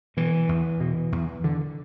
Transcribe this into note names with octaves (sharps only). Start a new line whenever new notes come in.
B2 E3
E2
B2
E2
D3